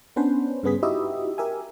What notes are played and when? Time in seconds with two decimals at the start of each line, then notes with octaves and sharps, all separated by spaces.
0.16 B3 C#4 D4 B4 C5
0.63 G2 C#3 B3 G#4 B6
0.83 D#4 E4 F#4 G4 D#5 E5
1.38 G4 A#4 E5 G#5